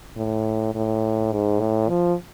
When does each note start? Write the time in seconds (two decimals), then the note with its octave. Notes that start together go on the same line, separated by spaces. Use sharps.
0.17 A2
0.75 A2
1.33 G#2
1.60 A2
1.89 F3